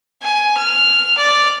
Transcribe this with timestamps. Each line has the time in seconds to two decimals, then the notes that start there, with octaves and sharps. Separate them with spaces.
0.23 G#5
0.58 F6
1.18 D5